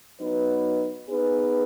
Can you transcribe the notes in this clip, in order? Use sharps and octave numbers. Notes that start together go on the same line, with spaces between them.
F#3 B3 D#4 B4
B3 D#4 G#4 B4